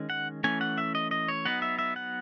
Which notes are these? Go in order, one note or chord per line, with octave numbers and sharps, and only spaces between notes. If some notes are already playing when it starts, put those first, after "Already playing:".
Already playing: D#3 G#3 C#4
F#5
E3 A3 C#4 G#5
F#5
E5
D#5
D#5
C#5
F#3 B3 D#4 F#5
E5
E5
F#5